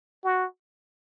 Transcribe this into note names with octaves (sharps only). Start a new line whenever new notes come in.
F#4